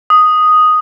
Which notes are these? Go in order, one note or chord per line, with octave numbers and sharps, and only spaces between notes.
D#6